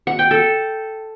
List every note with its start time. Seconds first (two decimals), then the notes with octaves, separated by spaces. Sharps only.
0.07 F#5
0.19 G5
0.31 A4